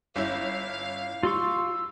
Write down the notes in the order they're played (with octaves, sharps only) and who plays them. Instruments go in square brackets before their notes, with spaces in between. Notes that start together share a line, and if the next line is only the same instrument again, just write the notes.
[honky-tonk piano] G1 C#4 E4 [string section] F5
[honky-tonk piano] G3 [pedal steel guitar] F4 C6 C#6 [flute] E6